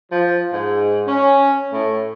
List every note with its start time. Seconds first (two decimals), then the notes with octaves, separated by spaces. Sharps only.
0.11 F3
0.52 G#2
1.07 C#4
1.72 A2